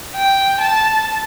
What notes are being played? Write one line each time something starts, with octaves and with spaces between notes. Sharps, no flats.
G5
A5